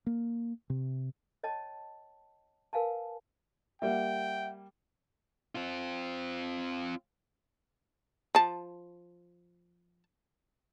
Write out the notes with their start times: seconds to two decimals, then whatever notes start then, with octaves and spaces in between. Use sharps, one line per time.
0.06 A#3
0.70 C3
1.43 C#5 D#5 G5 A5
2.73 A#4 B4 F5 G#5 A5
3.82 G3 A#3 E5 F#5 G5
5.55 C4 F4
8.35 F3 A5